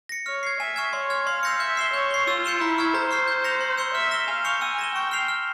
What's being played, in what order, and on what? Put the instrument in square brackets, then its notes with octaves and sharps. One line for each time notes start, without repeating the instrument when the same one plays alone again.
[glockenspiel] A#6 C#7
[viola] C#5 [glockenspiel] F6
[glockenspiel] G#6 C7
[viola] E5 [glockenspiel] G#5
[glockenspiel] C#6 F6 G#6
[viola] C#5 [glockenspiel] C6
[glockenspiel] F6 G#6
[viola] F5 [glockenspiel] C6
[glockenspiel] E6 G6 A#6 C#7
[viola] E5 [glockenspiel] G6
[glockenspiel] C7 E7 G7
[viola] C#5 [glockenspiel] G6
[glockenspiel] C7 G7
[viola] F4 [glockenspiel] E6
[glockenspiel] G6 C#7 E7 G7
[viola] E4 [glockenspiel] A#5
[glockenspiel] C#6 F6 G#6
[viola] C5 [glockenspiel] A#5
[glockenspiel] C#6 F6 C7
G6
A#6 C#7 F7
C6
E6 G6 C#7 G7
[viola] E5 [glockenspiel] F6
[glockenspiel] A#6 E7 G7
[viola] F5 [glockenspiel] G#5
[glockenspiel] C#6 G6 C#7 F7
[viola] G#5 [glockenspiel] E6
[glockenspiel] A#6 E7 G7
[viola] G5 [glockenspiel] C#6
[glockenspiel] F6 C7 F7
F6